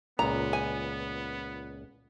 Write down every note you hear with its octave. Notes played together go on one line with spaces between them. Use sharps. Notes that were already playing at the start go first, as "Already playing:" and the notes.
C#2 A#2 B3 A#5
G#5